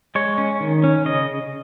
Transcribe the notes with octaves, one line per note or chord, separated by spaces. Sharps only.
G#3 C#5
C#4
D#3
C#4
C#3 D#5